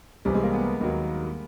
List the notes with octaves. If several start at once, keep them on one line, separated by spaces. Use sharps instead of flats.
C2 C3 E3 G3
G#3
A#3
B3
D#2 D#3 F#3 A#3